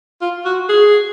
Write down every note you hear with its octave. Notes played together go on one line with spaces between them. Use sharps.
F4
F#4
G#4